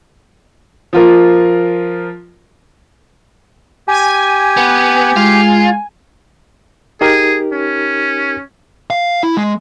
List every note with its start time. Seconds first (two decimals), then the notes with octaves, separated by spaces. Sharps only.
0.93 F3 F4 A#4
3.88 G4 G#5
4.57 B3
5.16 G#3 F4
7.01 D#4 G4 G#4 A#4
7.53 C#4
8.90 F5
9.23 E4
9.37 G#3